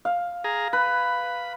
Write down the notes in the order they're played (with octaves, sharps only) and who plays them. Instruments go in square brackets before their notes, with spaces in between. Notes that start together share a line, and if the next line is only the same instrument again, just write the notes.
[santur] F5
[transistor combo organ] G#4 A#5
[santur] B4 [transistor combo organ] B5